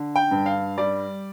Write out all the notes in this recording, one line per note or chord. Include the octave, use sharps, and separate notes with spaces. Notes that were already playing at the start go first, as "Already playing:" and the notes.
Already playing: D3
G5
G2
F5
G3 D5